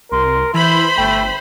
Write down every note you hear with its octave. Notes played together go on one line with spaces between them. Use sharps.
C2 A#4 C6
E3 E4 C5 B5
G1 A3 G5